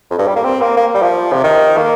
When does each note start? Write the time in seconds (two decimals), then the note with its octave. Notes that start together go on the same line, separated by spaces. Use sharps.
0.11 F2
0.18 G2
0.28 G3
0.36 A#3
0.44 C4
0.61 A#3
0.77 A#3
0.94 G3
1.02 F3
1.33 C3
1.44 D#3
1.78 A#3